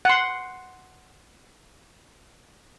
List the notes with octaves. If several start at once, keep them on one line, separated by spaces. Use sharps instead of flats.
F#5 C6